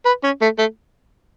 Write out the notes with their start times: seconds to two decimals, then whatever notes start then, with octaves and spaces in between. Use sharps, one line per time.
0.05 B4
0.24 C#4
0.41 A3
0.58 A3